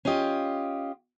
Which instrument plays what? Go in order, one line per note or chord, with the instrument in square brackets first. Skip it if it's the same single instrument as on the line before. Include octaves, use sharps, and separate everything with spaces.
[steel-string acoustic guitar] C#4 F4 G4 D#5